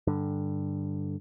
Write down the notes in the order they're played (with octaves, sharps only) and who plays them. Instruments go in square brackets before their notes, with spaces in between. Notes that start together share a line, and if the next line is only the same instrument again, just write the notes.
[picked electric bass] G2 D3